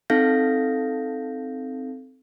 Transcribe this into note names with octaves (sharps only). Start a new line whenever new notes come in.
C4 D#4 A4 F5 G6 A#6